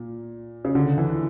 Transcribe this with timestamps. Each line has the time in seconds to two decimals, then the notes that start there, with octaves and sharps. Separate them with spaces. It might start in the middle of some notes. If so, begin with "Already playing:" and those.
Already playing: A#2
0.65 C#3
0.75 D3
0.98 E3